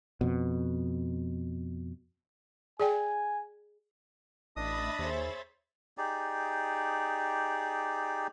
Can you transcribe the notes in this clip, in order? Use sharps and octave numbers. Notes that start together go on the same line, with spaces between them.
F2 B2
G#4 D5 G5 G#5
A1 D4 D#5 E5 B5 D#6 A6
D#2 G#4 C5 C#5
D#4 G4 G#4 D5